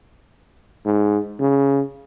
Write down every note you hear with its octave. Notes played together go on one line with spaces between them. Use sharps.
G#2
C#3